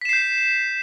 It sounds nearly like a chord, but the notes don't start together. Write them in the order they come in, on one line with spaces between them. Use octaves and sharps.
B6 E7 C7 G6